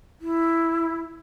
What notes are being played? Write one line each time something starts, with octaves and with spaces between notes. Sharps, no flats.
E4